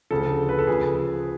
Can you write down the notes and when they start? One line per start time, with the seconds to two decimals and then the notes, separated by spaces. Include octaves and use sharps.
0.11 D2 C#3 F3 A4
0.49 B4
0.59 A4
0.67 C#3 F3 G#4